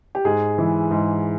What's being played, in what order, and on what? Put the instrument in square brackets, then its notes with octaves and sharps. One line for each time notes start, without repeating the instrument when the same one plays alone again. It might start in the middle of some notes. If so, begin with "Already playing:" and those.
[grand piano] G4
[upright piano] G#2 [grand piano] G#4
[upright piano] E3 G#3 E4
G#2